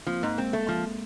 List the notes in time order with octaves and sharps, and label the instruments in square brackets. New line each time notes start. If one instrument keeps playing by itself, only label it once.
[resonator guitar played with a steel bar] F3 [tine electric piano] A#3 C4
[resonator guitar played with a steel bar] G#2 [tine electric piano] G#3 A#3
[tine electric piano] G#3 A#3 [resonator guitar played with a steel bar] C4
[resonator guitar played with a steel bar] A3
F3